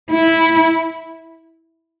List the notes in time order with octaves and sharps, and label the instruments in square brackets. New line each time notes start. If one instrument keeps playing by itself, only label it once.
[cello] E4